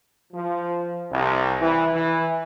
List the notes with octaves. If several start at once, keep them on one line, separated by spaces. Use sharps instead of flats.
F3
C2
E3
E3